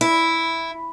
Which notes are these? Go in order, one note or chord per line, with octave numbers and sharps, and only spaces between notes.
E4